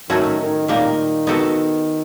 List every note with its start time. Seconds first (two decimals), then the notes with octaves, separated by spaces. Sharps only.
0.10 A2 D#3 F#3 A3 C#4 F#4
0.40 D#3
0.68 A#2 D#3 G3 A#3 D#4
1.27 B3 D#4 F#4 A4